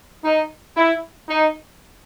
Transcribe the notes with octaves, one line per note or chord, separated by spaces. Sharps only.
D#4
E4
D#4